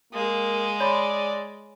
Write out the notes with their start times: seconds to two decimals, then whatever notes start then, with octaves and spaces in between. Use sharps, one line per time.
0.13 G#3 A#3
0.80 C#5 D5 B5 C6